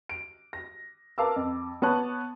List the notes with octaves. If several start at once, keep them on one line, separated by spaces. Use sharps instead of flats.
D7
A#6
A#4 B4 F5 A5 D6 E6
F2
B3 C#5 A5 C#6 F#6